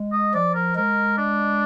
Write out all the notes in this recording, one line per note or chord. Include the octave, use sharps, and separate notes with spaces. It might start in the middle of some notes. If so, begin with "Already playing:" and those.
Already playing: G#3
D#5
F3 D5
A#4
G#3 A#4
D4